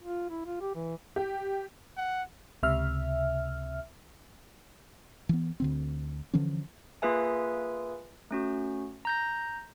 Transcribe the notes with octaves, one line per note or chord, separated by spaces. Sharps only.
F4
E4
F4
G4
E3
G4
F#5
C#2 C3 E5 F6
E3 B3
D2 D3 C4
D3 E3 F3 C#4
A#3 F4 G#4 B4 E5 G#5
A3 C#4 F#4
A#5 G6 A#6